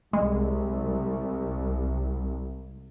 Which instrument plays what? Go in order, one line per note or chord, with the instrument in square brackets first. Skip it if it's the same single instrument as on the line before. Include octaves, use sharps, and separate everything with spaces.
[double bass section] C2 [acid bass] G#3